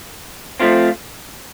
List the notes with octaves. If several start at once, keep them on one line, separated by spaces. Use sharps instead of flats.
F3 A3 C4 F4